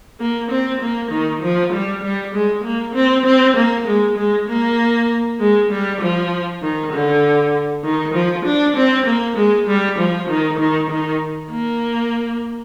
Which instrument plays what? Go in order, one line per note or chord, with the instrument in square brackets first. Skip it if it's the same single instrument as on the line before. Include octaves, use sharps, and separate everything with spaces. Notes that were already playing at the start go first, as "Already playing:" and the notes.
[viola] A#3
C4
A#3
D#3
F3
G3
G3
G#3
A#3
C4
C4
A#3
G#3
G#3
A#3
G#3
G3
F3
D#3
D3
D#3
F3
D4
C4
A#3
G#3
G3
F3
D#3
D#3
D#3
A#3